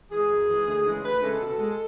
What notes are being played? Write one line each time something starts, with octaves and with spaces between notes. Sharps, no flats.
E3 G#3 G#4
F#2
E3 G#3
D2
C#3 E3 G#3
D2 B4
C#3 E3 G#3 A4
B2
G#3